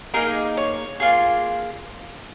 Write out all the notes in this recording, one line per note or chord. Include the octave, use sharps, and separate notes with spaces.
A#3 D#4 G#4 A#4
C#5
A#3 F4 G#4